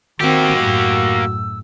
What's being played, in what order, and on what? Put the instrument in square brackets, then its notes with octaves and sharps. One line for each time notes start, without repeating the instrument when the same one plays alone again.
[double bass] D#3 C4 [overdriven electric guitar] A#3 G4 [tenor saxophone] F#4 [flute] E6
[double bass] F#2 A2